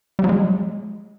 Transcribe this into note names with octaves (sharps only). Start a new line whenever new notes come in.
G3
F#3
G#3